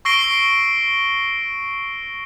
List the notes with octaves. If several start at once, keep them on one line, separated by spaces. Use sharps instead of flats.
C#6 E6 A#6 C7 D7 G7